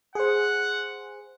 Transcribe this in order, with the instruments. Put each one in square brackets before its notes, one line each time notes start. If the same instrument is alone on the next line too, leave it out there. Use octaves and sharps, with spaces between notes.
[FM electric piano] G#4 C5 [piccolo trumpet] F#5